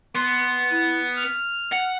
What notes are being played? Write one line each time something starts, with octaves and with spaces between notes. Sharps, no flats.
B3 C6
E4
F6
F#5